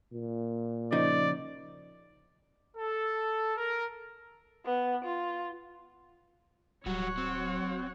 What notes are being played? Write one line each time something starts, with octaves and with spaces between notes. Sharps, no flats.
A#2
C#3 F3 D#4 D5
A4
A#4
B3
F4
D1 F#3 G3 F#4 C#5 F#5
C4